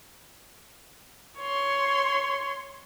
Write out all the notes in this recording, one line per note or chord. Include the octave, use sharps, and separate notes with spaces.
C#5 C6